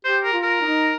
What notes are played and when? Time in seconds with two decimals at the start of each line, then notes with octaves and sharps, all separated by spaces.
0.05 G4 C5
0.24 A#4
0.33 F4
0.43 A#4
0.62 D#4